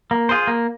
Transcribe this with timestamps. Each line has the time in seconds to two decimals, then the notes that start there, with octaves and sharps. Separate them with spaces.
0.11 A#3
0.29 F4 G#4 C5
0.47 A#3